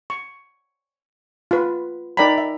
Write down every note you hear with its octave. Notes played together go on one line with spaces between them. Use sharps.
C#6
F4 B4
D#4 A#4 D5 G5 A#5 B5
E5